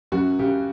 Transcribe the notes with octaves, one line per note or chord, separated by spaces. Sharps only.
F#2 F#4
C#3 G4